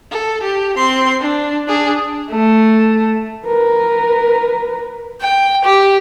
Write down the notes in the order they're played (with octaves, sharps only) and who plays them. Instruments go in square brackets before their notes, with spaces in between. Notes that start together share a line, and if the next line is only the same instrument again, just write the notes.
[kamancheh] A4
G4
C4 C6
D4
D4 G#4
[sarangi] A3
[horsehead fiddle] A#4 B4
[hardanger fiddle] G5
G4